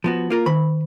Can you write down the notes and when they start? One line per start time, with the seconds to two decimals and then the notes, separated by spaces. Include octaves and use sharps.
0.04 F3 B3 F#4
0.30 A#3 F4 A#4
0.46 D#3 B5